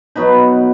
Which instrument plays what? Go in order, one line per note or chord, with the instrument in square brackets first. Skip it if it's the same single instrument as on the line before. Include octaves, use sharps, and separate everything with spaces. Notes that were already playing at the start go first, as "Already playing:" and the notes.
[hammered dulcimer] B2 F#3 B3 D#4 B5